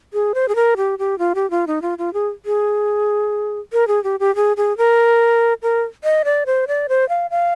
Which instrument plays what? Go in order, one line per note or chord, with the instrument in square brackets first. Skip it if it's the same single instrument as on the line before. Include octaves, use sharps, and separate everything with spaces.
[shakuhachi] G#4
C5
G#4
A#4
G4
G4
F4
G4
F4
D#4
F4
F4
G#4
G#4
A#4
G#4
G4
G4
G#4
G#4
A#4
A#4
D#5
D5
C5
D5
C5
F5
F5